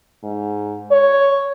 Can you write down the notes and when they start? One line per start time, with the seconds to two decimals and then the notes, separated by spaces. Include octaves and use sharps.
0.23 G#2
0.92 C#5